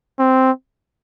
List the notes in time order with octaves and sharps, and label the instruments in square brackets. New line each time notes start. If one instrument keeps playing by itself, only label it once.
[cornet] C4